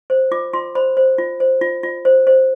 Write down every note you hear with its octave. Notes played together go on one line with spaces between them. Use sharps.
C5
F4 D6
F4 C6
C5 B5
C5
F4
C5
F4
F4
C5
C5